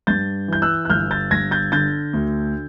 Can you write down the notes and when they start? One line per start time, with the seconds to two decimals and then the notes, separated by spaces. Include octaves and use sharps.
0.07 G2 G6 A6
0.48 E3 G6
0.62 E6 F#6
0.85 F#6
0.90 G1 F6 G6
1.11 G6 A6
1.31 G1 G#6 A#6
1.51 G6 A6
1.72 D3 G6 A6
2.13 D2